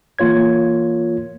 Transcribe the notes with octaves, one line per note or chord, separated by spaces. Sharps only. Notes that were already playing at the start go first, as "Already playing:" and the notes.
E3 A#3 F4 C#5 G#6